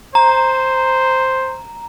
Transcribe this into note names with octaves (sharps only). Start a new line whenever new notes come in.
C5 A#5